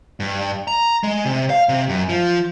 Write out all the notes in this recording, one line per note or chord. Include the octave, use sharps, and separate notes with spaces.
G2
A#5
G#3
C3
F5
C3
F#2
F3